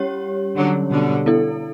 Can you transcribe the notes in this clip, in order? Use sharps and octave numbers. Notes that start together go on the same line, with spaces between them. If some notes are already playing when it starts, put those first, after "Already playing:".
Already playing: G3 C#4 G4 C#5
D3 F#3
B2 D3
B3 E4 A4